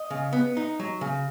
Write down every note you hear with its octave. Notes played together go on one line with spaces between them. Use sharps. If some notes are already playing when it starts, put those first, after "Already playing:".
Already playing: D#5
C#3
B3
D#4
F#3
C#3